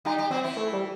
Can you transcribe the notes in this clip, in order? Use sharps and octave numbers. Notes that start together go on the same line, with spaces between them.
G3 D#4 G4
G3 G4
F#3 C4 F#4
E3 E4
A3
G3